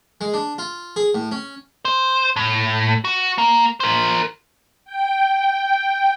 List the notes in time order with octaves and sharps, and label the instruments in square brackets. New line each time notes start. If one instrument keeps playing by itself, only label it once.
[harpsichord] G#3
D4
F4
G#4
A2
C#4
[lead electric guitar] C5
A2
F#4
A#3
A#4 C5
[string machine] G5